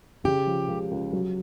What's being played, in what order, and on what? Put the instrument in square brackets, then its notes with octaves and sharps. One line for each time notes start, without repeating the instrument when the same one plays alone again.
[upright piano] C#3 [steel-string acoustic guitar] G4
[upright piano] F3
C#2
C#2
F#3